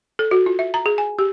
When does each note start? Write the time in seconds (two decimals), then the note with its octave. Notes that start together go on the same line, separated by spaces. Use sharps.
0.19 A4
0.31 F#4
0.46 F4
0.59 E5
0.74 A#5
0.86 G#4
0.98 G#5
1.19 G4